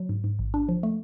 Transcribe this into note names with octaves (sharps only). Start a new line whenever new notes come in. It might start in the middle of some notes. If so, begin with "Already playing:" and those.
Already playing: F#3
G#2
G#2
A1
D4
F3
A3